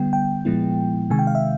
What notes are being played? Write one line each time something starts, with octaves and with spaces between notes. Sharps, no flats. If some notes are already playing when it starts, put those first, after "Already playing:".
Already playing: D3 G3 B3 G5
G5
A#2 F3 G#3 B3 E4
C3 D#3 G#3 G#5
G5
F5
E5